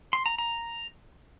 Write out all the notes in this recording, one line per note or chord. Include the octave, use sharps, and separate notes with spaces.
C6
A#5
A#5